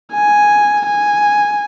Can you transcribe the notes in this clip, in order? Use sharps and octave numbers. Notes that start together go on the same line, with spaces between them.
G#5
G#5